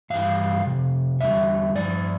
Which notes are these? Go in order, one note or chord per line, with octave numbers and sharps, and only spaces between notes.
G2 E3 G3 F5
F2 C3
E2 D3 G3 E5
G2 F3 D5